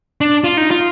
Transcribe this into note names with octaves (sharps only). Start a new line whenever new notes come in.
D4
F4
D#4
F4